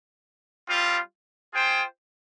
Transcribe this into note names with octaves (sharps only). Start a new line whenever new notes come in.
G3 C4 F4
F4 G#4 C5 G5